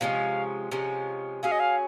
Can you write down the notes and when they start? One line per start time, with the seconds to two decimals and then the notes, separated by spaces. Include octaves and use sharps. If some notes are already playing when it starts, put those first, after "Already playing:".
0.01 C3 F3 G#3 C#4 F5
0.71 C3 F3 G#3 C#4
1.43 F#3 C#4 G#4 F5
1.52 D#5
1.60 F5